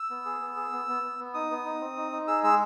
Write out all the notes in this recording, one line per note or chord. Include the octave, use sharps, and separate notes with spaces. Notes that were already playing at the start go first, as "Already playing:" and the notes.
Already playing: E6
B3
G#4
B3
G#4
B3
B3
B3
B3
D#4 D#6
B3
D#4
C4
D#4
D#4
G#4 E6
G#3 E6